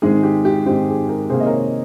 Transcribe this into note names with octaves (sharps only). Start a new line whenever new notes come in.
G#2 D#3 G#3 C4 G#4
G4
G4
G#2 D#3 G#3 C4 G4
G#4
G4 A#4
C3 D#3 A#3 G#4 C5
D#5
A#4 C#5